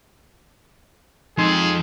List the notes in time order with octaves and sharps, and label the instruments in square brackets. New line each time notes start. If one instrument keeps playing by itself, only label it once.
[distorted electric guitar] F2 A4 [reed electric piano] G#3 D#4 C6 [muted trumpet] G#4